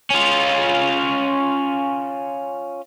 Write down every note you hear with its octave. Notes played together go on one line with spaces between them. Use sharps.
C#4 F4